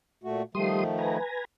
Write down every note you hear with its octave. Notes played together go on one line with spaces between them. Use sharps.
A#2 A3 F#4
D#3 F3 G3 A3 C6 D#6
B4 G#5 A#5